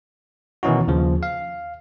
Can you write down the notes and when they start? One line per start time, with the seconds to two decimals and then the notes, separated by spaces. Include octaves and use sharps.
0.63 B2 D#3 E3 C#4 D#4 F#4
0.88 D#2 C#3 F3
1.23 F5